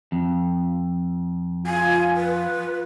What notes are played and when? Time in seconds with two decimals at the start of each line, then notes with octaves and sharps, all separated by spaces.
0.12 F2
1.66 F4 G#5
2.17 B4